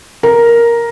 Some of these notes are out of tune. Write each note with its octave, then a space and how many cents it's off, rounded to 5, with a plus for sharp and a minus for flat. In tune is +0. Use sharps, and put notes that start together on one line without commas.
A#4 +5